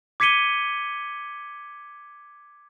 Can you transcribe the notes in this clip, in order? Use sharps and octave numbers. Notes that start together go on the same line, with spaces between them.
D6 G#6 B6 C#7 D#7 G7